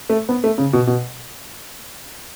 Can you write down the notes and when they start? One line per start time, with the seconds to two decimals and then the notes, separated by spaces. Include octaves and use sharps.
0.10 A3
0.29 B3
0.44 A3
0.58 C#3
0.73 B2
0.87 B2